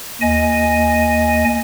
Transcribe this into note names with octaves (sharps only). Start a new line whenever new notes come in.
D#2 D#5 G#5